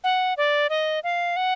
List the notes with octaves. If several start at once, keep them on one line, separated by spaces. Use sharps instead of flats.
F#5
D5
D#5
F5
F#5